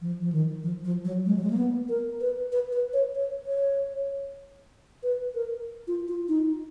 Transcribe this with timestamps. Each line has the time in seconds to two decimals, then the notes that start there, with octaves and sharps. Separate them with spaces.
0.01 F3
0.21 F3
0.32 D#3
0.63 F3
0.85 F3
1.05 F#3
1.26 G#3
1.37 F#3
1.44 G#3
1.50 A#3
1.57 B3
1.89 A#4
2.21 B4
2.52 B4
2.73 B4
2.93 C#5
3.15 C#5
3.46 C#5
5.03 B4
5.35 A#4
5.88 F4
6.08 F4
6.29 D#4